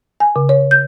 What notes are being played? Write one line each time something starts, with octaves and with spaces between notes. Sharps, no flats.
G#5
C#3
C#5
G6